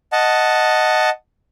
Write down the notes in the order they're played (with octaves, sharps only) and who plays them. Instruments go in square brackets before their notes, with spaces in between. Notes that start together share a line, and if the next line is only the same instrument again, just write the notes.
[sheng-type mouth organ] D#5 F#5 A5